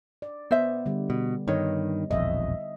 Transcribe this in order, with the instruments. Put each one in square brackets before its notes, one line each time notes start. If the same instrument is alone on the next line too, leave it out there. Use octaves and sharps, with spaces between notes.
[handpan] D5
[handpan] B3 [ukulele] C5 D#5 E5
[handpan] D3 G3
[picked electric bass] B2
[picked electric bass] G2 D#3 [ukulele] C#5 [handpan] D#5
[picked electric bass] E1 A#1 F2 [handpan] D#5 E5